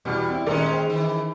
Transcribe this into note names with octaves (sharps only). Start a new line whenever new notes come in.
E2 B2 G3
C4 E4
D#1 D#3 G#3 C#4 A#4 D5
C5 G5
D#3 E3